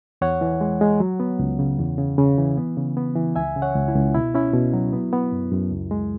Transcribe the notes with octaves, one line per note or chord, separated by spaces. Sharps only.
E2 C#5 F#5
E3
G#3
G#3
F#3
B3
C#2
C#3
E2
C#3
C#3
E3
B3
C#3
B3
E3
C#2 E5 G#5
C#3
C#5 F#5
C#2
E4
C#2
B2 E4
C#4 E4
B2
F#3
B3
B3
F#2
F#2
C#2
G#3